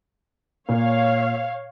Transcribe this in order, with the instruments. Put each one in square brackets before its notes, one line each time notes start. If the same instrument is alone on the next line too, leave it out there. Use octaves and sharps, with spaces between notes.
[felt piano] A#2 [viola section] C#5 F5